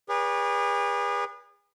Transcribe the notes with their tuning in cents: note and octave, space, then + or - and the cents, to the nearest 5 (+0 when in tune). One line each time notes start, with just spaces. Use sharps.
G#4 -40 B4 -30 D5 -45